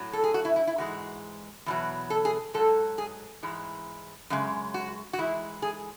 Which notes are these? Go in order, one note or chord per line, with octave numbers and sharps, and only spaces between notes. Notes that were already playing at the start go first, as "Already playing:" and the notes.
Already playing: A2 F#3
A4
G#4
F#4
E4
E4
E4
G#2 E3 G#3 F#4
E2 B2 F#3
A4
G#4
G#2 F#3 A4
G#4
G#2 E3 G#3
F#2 C#3 G#3
F#4
F#4
G#2 E3 G#3 E4
G#4